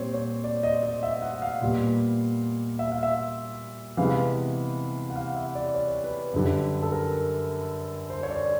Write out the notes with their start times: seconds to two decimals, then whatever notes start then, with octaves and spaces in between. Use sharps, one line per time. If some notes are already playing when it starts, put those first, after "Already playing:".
Already playing: A#2 G3 C4 C5 C#5
0.14 C#5
0.44 D5
0.63 D#5
0.83 D#5
1.03 E5
1.22 F#5
1.42 F5
1.61 A#2 G3 B3
2.79 E5
2.92 F5
3.03 E5
3.97 C3 E3 G#3 B3 F5
5.10 F#5
5.16 F5
5.35 E5
5.55 D5
5.75 C#5
6.04 B4
6.34 F#2 D3 G3
6.83 A4
6.92 A#4
8.10 C5
8.23 C#5
8.30 D5
8.45 D5